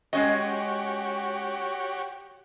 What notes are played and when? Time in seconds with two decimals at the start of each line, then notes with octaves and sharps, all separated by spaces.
0.13 G#3 C#4 F#4 G4 C#5 D#5